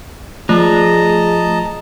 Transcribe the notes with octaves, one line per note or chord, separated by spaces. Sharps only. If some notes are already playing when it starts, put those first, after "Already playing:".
F3 A3 G#4 D#5 A5 A#5